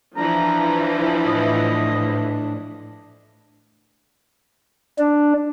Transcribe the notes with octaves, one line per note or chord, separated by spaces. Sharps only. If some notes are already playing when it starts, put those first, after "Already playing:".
E3 F3 D4 A#5
A2 D#5
D4